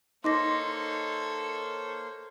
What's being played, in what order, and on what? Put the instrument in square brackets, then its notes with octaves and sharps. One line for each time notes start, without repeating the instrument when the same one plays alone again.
[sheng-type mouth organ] A#3 C5 [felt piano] D#4 [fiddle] A4 C#5 [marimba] C6 D6 A#6